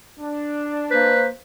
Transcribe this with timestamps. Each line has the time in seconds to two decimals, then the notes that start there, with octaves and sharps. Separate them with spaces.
0.20 D4
0.91 A#3 B4 C5